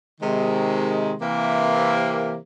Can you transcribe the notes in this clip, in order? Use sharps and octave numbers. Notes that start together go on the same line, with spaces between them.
C3 D#3 G#3
C3 E3 A#3